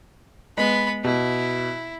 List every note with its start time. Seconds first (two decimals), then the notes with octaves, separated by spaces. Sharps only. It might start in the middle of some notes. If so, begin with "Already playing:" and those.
0.58 G#3 B3 B5
1.04 B2 E4